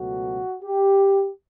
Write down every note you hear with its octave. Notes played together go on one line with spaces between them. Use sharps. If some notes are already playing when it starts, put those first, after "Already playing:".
Already playing: C#2 B2 F#3 A3 F#4
G4